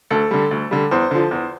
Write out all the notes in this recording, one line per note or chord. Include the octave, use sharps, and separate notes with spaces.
D2 A4
D3 G3
D2
D3 G3
E2 C5
D3 F3
E2